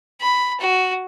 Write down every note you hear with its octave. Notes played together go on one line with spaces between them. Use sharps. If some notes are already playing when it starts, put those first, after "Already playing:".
B5
F#4